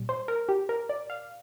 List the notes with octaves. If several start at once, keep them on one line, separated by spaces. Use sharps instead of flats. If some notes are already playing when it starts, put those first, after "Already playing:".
Already playing: A#2 G3
C5
A#4
G4
A#4
D5
F5